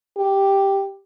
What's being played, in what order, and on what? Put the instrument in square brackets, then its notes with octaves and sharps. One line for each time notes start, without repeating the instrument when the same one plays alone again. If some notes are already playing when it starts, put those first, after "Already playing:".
[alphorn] G4